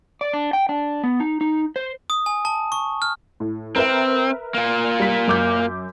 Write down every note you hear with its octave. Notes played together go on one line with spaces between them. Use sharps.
D5
D4
G5
D4
B3
D#4
D#4
C5
D#6
G#5
A5
C#6
F6
A2
C4 A#4 B4 E5
A#3 F4
G3 B6
F#2 D6 G6